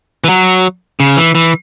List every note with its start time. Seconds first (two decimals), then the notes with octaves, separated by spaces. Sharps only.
0.24 E3
0.29 F#3
1.00 C#3
1.17 E3
1.35 E3